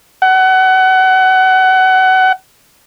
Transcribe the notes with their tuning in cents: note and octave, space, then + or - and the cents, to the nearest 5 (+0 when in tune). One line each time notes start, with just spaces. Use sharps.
F#5 +25